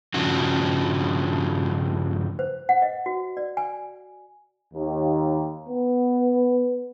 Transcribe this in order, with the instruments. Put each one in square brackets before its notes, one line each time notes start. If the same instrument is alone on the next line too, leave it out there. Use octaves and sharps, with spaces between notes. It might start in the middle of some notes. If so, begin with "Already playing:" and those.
[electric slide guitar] G2 C#3 F3 D4 F#4
[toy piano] C5
F#5
D#5
F#4
D5
G#5
[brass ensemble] D#2
B3